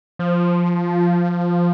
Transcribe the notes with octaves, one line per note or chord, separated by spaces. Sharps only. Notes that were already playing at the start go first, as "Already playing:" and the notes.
F3